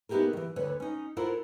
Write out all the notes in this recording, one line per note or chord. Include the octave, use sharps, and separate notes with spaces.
B3 D#4 E4 G4 G#4 A#4
D#3 E3
D2 D3 B4 C#5
C#4 D#4
E4 F4 A4 A#4 C5 F#5